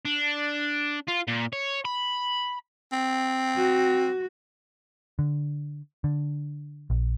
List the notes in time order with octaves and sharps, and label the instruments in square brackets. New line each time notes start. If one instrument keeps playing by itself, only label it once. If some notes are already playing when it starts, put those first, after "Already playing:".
[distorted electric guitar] D4
F4
A#2
C#5
B5
[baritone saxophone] C4
[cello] F#4
[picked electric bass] D3
D3
A#1